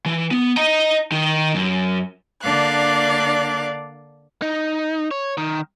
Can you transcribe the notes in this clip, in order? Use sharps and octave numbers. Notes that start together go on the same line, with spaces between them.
E3
B3
D#5 A#5
D#3
F#2
D3 A#3 D4 D5 F5 F#6
D#4
C#5
D#3